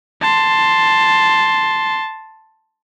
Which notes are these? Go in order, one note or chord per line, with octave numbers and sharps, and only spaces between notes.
A5 C6